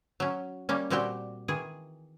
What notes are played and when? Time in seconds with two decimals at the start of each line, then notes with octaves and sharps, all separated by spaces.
0.20 F#3 C#4
0.69 G3 A#3 C#4
0.90 A#2 G3 C4 F#4 G4 G5
1.48 D#3 E3 G#4